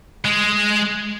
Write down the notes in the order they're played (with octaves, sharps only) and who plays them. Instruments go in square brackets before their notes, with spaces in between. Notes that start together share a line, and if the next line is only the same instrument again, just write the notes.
[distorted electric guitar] G#3